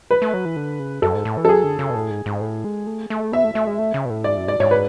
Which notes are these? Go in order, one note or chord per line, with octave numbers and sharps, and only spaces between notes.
B4
A3
F#3
E3
D3
C#3
F#2 A4
G#2
A2
E3
A4
F#3 G#4
D3
C#3
B2
A2
G#2
G#2
A2
G#3
A3
A3
B3 E5
A3
A3
G#3
A3
C#3
B2
A2
G#2 D5
F#2
G#2 D5
G#2 C#5
B4